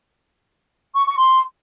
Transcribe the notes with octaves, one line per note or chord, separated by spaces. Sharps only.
C#6
C#6
C6